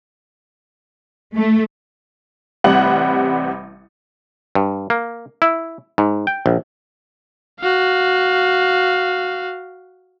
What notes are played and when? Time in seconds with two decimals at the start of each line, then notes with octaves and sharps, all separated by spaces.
1.36 A3
2.64 A1 C3 G3 F#5 F#7
4.55 G2
4.90 A#3
5.42 E4
5.98 G#2
6.27 G5
6.46 A#1
7.61 F#4 F5